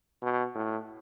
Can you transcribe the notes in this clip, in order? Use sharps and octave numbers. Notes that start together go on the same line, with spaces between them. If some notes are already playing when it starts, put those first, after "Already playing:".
B2
A2